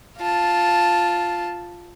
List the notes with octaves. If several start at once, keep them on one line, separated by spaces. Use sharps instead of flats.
F4 A5